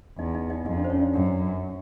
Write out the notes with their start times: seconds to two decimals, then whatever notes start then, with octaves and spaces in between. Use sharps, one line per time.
0.18 E2 D#4 D#5
0.34 D#4 D#5
0.50 D#4 D#5
0.66 F2 D#4 D#5
0.77 D4 D5
0.84 C5
0.89 C#4 C#5
1.01 D4 D5
1.14 F#2